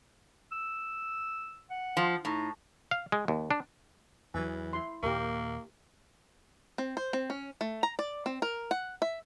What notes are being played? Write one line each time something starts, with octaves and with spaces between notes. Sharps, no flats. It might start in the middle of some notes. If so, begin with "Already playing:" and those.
E6
F#5
F3
A2 D#4
F5
G#3
D#2
D4
E2 E3 F#3 G#5
E4 C6
D#2 A#2 A#3 G4 A#4
C4
C5
C4
C#4
A3
A#5
D5
C4
A#4
F#5
E5